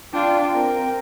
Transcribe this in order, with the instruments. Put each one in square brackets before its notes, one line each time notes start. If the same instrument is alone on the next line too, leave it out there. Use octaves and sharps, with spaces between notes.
[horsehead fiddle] D4 F4 [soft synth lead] G5
[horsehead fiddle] C4 A#4